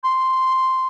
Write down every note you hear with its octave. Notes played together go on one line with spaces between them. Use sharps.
C6